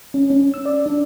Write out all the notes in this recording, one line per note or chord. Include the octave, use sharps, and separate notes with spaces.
C#4
C#4
E6
D5
D4